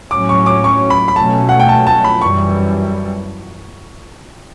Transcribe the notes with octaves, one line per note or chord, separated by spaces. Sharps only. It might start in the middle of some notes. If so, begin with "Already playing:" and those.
A2 F#3 C#4 D6
C#6
D6
C#6
B5
B5
B2 F#3 A3 C#4 A5
F#5
G5
A5
A5
B5
F#2 E3 G3 C#6